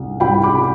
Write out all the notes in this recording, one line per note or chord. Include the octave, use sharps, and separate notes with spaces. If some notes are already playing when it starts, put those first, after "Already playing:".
Already playing: C2
C2 G5 B5
B5 D6